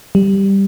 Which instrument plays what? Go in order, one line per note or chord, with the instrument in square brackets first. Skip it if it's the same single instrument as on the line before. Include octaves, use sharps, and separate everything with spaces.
[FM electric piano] G3